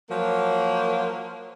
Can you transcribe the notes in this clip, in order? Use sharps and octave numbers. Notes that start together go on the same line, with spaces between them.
F3 F#3 A#3